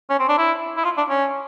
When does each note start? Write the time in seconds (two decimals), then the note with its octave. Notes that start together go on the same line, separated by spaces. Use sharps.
0.09 C#4
0.19 C4
0.28 D4
0.38 E4
0.77 E4
0.84 F4
0.97 D4
1.09 C#4